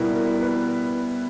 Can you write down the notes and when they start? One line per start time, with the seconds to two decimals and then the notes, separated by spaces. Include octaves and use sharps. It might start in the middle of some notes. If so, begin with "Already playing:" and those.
Already playing: B2 G3 B3 E4 A#4
0.14 A#4
0.41 B4